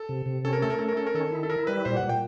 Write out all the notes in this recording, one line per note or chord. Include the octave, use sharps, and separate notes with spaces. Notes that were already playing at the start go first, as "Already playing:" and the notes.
Already playing: A4
C3
C3
C#4 A4
A#4
A3 A4
A#4
C#4 A4
A#4
C#4 A4
A#4
D#3 A4
E4
A4
E4 A#4
G3 B4
A#2 C5
F#5
A#2
G5